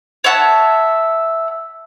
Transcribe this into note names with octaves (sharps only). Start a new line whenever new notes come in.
C#5 E5 F#5 A5